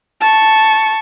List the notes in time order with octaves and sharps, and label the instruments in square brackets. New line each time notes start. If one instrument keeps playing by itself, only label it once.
[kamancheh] A5 C#6